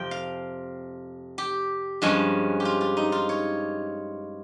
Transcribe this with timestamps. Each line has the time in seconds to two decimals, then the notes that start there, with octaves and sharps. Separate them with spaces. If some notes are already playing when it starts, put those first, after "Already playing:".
Already playing: F2 C3 F3 G5
0.11 F5
1.38 G4
2.02 G2 F3 G#3 C#4
2.60 G4
2.65 F4
2.81 F4
2.97 D#4
3.12 F4
3.29 C#5